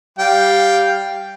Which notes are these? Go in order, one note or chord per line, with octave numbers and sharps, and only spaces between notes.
G3 F5 G5